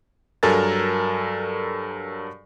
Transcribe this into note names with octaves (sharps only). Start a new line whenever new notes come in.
G2 F#3 A4 A#4 G#5 A6